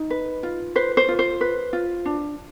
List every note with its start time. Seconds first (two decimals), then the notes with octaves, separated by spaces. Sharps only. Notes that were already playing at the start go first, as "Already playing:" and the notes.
Already playing: D#4
0.10 B4
0.43 F4
0.76 B4 C5
0.97 C5
1.08 F4
1.19 C5
1.41 B4
1.73 F4
2.05 D4